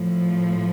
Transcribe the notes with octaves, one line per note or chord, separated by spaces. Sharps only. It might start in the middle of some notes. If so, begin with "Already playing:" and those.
Already playing: A2 F3